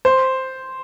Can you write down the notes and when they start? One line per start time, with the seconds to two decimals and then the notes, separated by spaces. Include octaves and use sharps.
0.05 C5